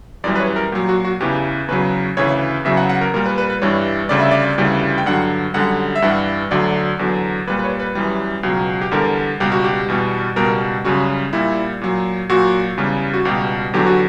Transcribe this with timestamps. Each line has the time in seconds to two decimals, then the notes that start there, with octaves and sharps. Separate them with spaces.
0.24 F#2 E3 G3 D5
0.36 B4
0.40 C#5
0.56 A#4
0.72 A#2 F#3 G4
0.89 F#4
1.05 F#4
1.20 E2 C#3 E3 G4
1.68 E2 C#3 F#3 B4
2.17 D2 C#3 E3 C#5
2.65 E2 C#3 F#3 E5
2.77 F#5
2.89 F#5
3.01 A#4
3.14 A#2 G3 A#4
3.26 B4
3.38 B4
3.50 B4
3.62 G2 E3 G3 C#5
4.09 D2 C#3 G3 D5
4.20 E5
4.31 D5
4.58 D2 C#3 E3 G3
4.98 G5
5.06 G2 D3 F#3 F#5
5.54 F#2 D3 G3 F#5
5.96 E5
6.02 G2 E3 G3 F#5
6.51 D2 D3 F#3 D5
6.99 E2 D3 F#3
7.47 A#2 G3 B4
7.59 B4
7.64 C#5
7.79 B4
7.95 F#2 E3 G3
8.43 C#2 B2 F#3
8.81 G4
8.91 E2 D3 G3 A#4
9.40 C#2 B2 G3 G4
9.52 F#4
9.64 G4
9.88 E2 B2 G3
10.36 C#2 B2 G3 A#4
10.84 F#2 C#3 G3 F#4
11.33 A#2 G3 E4
11.81 A#2 F#3
12.29 A#2 F#3 F#4
12.77 E2 C#3 G3
13.14 F#4
13.25 C#2 B2 G3 G4
13.73 E2 D3 F#3 G4
13.86 F#4